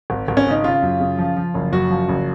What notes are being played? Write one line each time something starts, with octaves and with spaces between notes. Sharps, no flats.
G#1
G#1
C#4
C#3 D#4
C#3 F4
F#2
C#3
F3
F3
F#1
F#2 F#4
F3
F#1